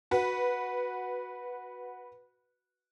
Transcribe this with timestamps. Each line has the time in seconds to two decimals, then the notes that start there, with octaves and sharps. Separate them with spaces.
0.11 F#4 B4